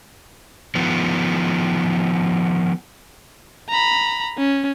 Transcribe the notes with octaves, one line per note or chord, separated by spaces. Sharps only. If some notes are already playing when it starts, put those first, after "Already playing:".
D#3 F3 B3
A#5 B5
C#4